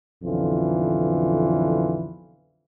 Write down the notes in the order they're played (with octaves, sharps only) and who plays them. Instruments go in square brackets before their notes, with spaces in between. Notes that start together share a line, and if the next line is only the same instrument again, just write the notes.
[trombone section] B1 F2 D3 E3 F4